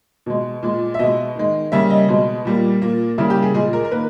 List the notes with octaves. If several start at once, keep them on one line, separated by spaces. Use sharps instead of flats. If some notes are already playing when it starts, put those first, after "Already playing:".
B2 G#3
A#2 G#3
E5
B2 G#3 D#5
D#3 G#3
C#3 G3 A#3 E5
D#5
B2 G#3
A#2 G3 A#3
A#2 A#3
C#3 G3 A#3 E4
G4
G#4
A#2 G#3 G#4
A#4
A#4
D#3 A#3 B4